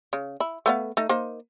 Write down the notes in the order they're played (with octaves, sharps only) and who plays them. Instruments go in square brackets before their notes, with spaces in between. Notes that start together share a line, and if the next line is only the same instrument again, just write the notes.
[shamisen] C#3
E4
A3 B3 F5
A3 D#4
A#3 D#4 C5